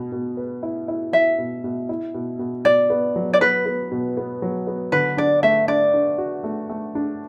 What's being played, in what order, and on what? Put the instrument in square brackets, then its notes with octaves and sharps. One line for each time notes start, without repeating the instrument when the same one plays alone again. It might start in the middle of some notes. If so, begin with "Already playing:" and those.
Already playing: [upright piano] B2
B2
B4
E4
E4
[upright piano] E4 [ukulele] E5
[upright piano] B2
B2
E4
B2
B2
[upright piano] B2 [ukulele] D5
[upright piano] B3
F#3
[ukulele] D5
[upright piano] B3 [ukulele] B4
[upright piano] B3
B2
B3
F#3
B3
[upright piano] D3 [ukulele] B4
[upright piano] D4 [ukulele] D5
[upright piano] A3 [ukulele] E5
[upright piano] D4 [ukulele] D5
[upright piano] D4
F#4
A3
A3
D4